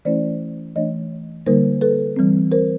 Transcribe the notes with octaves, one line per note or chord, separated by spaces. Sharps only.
E3 A3 C#4 E4 C5 D5
E3 A3 D4 C#5 D#5
D3 G3 A#3 D#4 A#4 C5
A4 B4
E3 G3 C4
A#4 C5